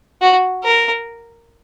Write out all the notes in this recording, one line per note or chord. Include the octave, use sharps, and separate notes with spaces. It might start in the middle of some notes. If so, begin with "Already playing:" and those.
F#4
A#4